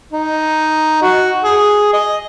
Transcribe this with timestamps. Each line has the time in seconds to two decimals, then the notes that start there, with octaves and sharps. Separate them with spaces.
0.12 D#4
1.02 F#4
1.44 G#4
1.93 D#5